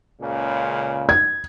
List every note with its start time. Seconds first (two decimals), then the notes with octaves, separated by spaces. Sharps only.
0.21 C#2 A#2 C#3
1.09 G#6